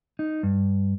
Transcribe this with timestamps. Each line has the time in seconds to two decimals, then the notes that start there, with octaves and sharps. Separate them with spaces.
0.19 D#4
0.43 G2